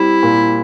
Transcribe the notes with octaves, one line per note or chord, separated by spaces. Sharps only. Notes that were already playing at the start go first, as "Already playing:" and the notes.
Already playing: G3 C4 E4
A#2